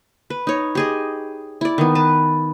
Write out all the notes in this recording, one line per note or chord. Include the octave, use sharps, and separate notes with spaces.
B4
D#4 C#5
G4 G#4 D#5
E4 D5
D#3 B3
B4 A5